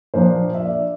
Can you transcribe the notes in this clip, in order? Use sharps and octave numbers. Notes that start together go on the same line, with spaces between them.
A#2 F3 A#3 D4 C5
E5
D5